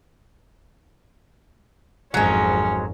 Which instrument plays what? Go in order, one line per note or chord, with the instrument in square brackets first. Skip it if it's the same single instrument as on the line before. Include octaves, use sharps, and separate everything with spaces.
[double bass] G#1 F2 [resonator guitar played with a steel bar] F#3 G#3 [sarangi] C#4